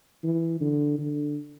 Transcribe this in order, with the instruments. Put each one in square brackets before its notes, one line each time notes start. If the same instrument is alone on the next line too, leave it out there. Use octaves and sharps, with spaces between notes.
[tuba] E3
D3
D3